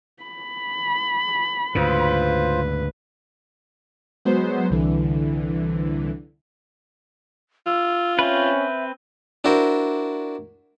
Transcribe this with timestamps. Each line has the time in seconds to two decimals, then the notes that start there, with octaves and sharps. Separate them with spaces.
0.23 B5
1.75 D2 G#2 C#3 F4 B4 C5
4.25 F#3 G#3 B3 C5
4.70 C2 D3 E3
7.66 F4 E6
8.19 C4 C#4 B4 E5
9.44 D4 E4 F#4 A#4 C5